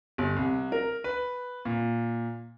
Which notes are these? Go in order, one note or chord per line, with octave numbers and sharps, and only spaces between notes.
G1
C2
A#4
B4
A#2